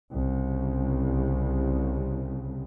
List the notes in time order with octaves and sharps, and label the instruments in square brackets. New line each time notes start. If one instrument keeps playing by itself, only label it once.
[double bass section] C2 C#3